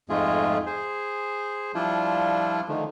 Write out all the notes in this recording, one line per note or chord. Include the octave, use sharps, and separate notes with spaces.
F2 G#2 G#3 A3 F4 G#4
G#4 C5
F3 G3 D4 E4 F4
D3 D#3 F3 A3